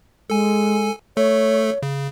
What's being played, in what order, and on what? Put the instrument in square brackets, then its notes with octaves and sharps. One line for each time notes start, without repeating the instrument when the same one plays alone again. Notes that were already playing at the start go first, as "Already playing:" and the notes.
[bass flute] G#3 [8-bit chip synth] A4 G#5
[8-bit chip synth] A3 A4 [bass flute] C#5
[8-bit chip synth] C#3